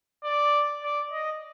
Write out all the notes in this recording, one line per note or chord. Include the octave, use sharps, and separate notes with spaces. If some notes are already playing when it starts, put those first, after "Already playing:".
D5
D5
D#5